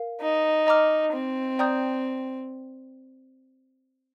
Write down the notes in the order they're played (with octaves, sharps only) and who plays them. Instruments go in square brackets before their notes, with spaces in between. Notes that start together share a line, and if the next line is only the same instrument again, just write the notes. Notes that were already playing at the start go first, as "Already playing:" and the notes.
Already playing: [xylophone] A#4 F5
[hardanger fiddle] D#4
[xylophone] D#5 A#5 D6 F6
[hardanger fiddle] C4
[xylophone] D5 G5 A#5 D#6 G6